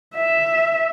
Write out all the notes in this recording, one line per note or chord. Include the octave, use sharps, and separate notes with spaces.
E5